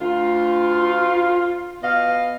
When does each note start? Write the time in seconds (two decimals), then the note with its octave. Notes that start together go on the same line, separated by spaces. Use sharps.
0.01 D2 F4
1.83 B2 D#5 F5